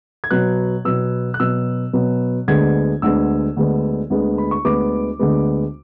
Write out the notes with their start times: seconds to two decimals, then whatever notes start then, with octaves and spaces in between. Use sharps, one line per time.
0.24 G#6
0.31 B2 F#3 B3 F#6
0.85 B2 F#3 B3 E6
1.34 F#6
1.40 B2 F#3 B3 E6
1.93 B2 F#3 B3
2.48 D2 D3 G#3 B3 G#6
3.02 D2 D3 G#3 B3 E6
3.57 D2 D3 G#3 B3
4.10 D2 D3 G#3 B3
4.38 B5
4.51 C#6
4.65 D2 D3 G#3 B3 D6
5.19 D2 D3 G#3 B3